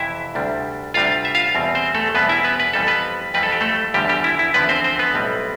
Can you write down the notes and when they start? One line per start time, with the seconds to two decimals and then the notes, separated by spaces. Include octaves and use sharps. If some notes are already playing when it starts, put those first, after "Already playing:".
Already playing: F2 C3 E3 E4 E5
0.35 D2 C3 G3 D4
0.94 D2 C3 G3 D4 F4 F5
1.25 E5
1.35 F4 F5
1.55 E2 B2 G3 C4
1.75 C4 C5
1.95 A3 A4
2.14 E2 B2 G3 B3 C4 B4
2.29 E4 E5
2.44 B3 B4
2.60 B4
2.73 F2 E3 G3 C4 A4
2.87 B3 B4
3.34 F2 E3 G3 C4 B4
3.43 A4
3.52 G4
3.61 A3 A4
3.94 E2 D3 F3 G3 G4
4.09 G3 G4
4.24 E4
4.39 E4
4.54 E2 D3 F3 B3 B4
4.69 C4 C5
4.84 C4 C5
4.99 B3 B4
5.14 B1 A2 G3 C4